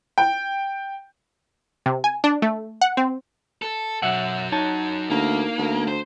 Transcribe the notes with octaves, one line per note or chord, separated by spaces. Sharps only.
G5
C3
G#5
D4
A3
F#5
C4
A4
B1 F#2 F#3 E5 F#5
D#4 C#5 A5
D2 A#3
D2
C5